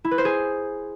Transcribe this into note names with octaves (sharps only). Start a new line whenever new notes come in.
E4
B4
C5
G#4